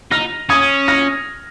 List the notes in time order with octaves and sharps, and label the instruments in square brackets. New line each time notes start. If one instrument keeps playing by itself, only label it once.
[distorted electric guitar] D#4 [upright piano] F6 A#6
[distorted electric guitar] C#4 [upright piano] D#6 G#6
[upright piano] F6 A#6